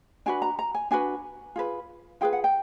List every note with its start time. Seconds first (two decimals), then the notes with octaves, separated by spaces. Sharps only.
0.26 D4 F#4 B4 G#5
0.42 A#5
0.59 A#5
0.74 G#5
0.91 D4 F#4 B4 G#5
1.56 F4 G#4 B4
2.21 F4 G#4 B4 G5
2.33 F#5
2.44 G5